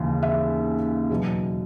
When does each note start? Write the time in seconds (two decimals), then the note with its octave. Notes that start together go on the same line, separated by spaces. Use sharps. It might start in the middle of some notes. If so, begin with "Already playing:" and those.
Already playing: D#2 C#3 E3
0.22 E5
1.10 E2 B2 F#3